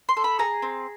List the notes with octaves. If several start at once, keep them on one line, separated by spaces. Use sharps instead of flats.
C6
A4
B5
G#4 A#5
C4